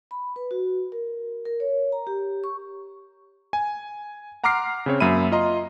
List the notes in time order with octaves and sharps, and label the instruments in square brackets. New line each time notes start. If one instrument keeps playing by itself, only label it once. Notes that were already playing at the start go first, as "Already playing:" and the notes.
[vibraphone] B5
B4
F#4
A#4
A#4
C#5
A#5
G4
C#6
[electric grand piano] G#5
F#5 A#5 C6 D6 F6 C7
C#3 C4 C#5
F#2 F#3 A#3 E5 B5 D#7
F4 D#5 A#5 C6